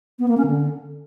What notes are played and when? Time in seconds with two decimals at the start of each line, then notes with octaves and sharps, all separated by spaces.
0.19 B3
0.28 A#3
0.37 C#4
0.47 D3